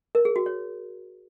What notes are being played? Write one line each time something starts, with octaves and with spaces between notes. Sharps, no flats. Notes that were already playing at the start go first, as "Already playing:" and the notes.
A#4
G#4
F#4
C#5